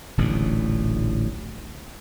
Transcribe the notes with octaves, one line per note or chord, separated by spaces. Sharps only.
D1 A1 D2 A#2